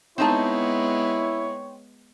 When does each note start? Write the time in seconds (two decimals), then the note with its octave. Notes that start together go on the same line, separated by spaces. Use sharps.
0.18 G#3 B3 C4 D#4 E4 C#5 A5